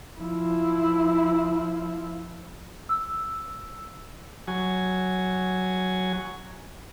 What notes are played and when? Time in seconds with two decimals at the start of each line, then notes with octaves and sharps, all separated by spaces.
0.19 F3 E4
2.89 E6
4.48 F#3 G#5